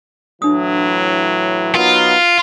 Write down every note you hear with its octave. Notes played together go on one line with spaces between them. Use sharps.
A2 E3 F#3 D4 D#6
F#3 B3 D#4 F4 A#4